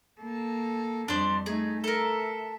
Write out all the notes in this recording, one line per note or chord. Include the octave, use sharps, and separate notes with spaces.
A#3 A4
F2 G3 D4 C5
A3 D#4 G#4
A4 A#4 E5